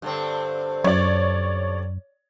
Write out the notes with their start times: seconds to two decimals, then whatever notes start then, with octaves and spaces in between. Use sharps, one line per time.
0.02 G2 D3 C4
0.84 F#2 C#5 D5